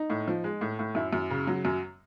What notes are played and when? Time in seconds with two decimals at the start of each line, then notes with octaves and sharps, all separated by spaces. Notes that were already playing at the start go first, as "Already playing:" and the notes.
Already playing: D#4
0.10 A2
0.28 F3
0.44 G#3
0.61 A2
0.79 A2
0.95 F#2 E4
1.13 F#2
1.30 C#3
1.47 F#3
1.65 F#2